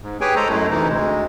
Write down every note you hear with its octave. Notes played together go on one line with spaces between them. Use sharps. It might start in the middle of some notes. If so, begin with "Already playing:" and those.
G#2
G4 G#4 B4 C#5 G5 G#5
G#3 A4 C5 C#5 A#5
F#2 G#3 A3 E4
D2 C3 E3 D#4 E4
D2 G#3